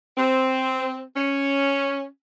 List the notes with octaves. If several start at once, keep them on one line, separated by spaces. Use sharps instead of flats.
C4
C#4